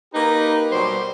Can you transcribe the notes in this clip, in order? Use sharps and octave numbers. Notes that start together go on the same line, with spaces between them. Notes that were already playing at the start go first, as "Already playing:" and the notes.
A#3 D#4 G4 B4
B2 F#3 G3 C5